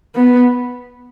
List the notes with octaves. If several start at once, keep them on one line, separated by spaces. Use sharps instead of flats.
B3